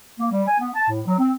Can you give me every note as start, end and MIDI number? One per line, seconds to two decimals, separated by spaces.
0.20 0.29 58
0.31 0.43 55
0.48 0.57 80
0.60 0.70 59
0.75 0.87 81
0.89 1.01 45
1.07 1.16 54
1.19 1.32 60